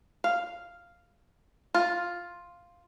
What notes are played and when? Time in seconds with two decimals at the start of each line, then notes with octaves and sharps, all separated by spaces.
0.24 F5
1.74 F4